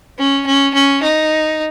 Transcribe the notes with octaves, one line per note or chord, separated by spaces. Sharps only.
C#4
C#4
C#4
D#4